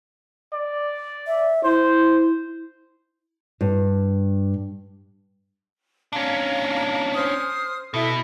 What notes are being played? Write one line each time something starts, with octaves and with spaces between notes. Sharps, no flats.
D5
E5
E4 C5
G2
C#4 D4 F5 A#5
C5 D#6 F6
B2 E4 A4 E5